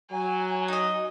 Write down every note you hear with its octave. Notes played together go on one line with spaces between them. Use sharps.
F#3 G#5
D#4 D#5